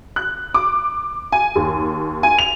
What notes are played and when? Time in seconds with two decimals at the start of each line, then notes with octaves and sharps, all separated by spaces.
0.16 F#6
0.54 D6
1.32 G#5
1.55 D#2
2.23 G#5
2.39 F7